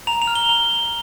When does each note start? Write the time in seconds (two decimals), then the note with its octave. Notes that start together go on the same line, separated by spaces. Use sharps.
0.07 A#5 F7
0.22 F7
0.27 F6
0.35 G7
0.49 A#5 F7